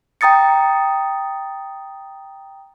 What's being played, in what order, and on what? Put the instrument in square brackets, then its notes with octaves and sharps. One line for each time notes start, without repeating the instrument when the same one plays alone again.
[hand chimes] G5 A#5 D#6 A6 C#7